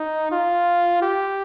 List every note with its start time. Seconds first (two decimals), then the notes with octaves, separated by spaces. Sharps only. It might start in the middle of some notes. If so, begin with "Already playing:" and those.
Already playing: D#4
0.31 F4
1.02 G4